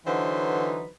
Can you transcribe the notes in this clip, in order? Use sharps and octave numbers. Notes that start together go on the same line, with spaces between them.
D3 E3 F#3 D#4 B4 C5